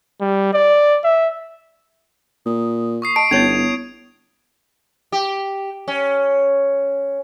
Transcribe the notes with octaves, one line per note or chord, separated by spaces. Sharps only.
G3
D5
E5
A#2 D#6
C#6 D#6 C7
D#5 A5 D7
G1 B3 C#4 E4 C#5 D#5 G#6 F7
G4
C#4